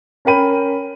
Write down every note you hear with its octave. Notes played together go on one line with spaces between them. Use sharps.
C#4 A#4 G5 B5 D#7